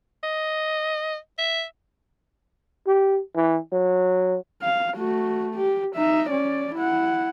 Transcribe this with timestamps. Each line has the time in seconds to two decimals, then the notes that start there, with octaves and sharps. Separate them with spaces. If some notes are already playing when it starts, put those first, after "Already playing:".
0.23 D#5
1.38 E5
2.87 G4
3.35 E3
3.72 F#3
4.63 F5
4.97 A3 F#4
5.56 G4
5.96 D#4 E5
6.30 C#4 D5
6.75 E4 F#5